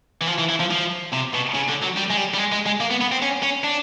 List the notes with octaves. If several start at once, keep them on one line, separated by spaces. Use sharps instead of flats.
E3
F3
E3
E3
F3
F3
C3
B2
C#3
D3
F#3
G3
G#3
G3
G3
G#3
G#3
G#3
A#3
B3
B3
C4
C#4
C#4
D4